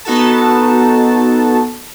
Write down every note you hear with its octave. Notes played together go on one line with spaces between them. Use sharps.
B3 D#4 F#4 A4 A5